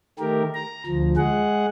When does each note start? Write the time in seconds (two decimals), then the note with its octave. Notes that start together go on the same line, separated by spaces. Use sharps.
0.19 D#3 A3 G4 A#4
0.55 A#5
0.86 D2 F3
1.17 G#3 G#4 F#5